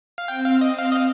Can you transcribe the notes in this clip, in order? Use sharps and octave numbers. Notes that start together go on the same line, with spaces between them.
F5
C4 G5
F5
D#5
F5
D#5
F5